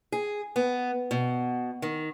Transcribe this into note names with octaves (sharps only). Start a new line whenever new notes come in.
G#4
B3
B2
D#3